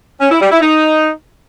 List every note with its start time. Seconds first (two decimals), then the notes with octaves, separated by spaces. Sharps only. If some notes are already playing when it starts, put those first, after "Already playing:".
0.21 C#4
0.31 E4
0.41 G3
0.51 E4
0.61 D#4